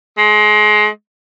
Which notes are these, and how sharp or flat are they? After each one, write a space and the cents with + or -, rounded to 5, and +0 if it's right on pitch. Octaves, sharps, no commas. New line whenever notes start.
G#3 +30